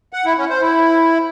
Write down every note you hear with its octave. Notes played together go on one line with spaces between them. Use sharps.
F#5
E4
C#4
C5
E4